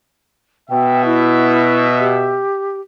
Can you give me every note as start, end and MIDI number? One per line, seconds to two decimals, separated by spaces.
0.70 2.45 47
0.70 2.45 76
0.70 1.02 79
1.05 1.87 64
2.00 2.80 67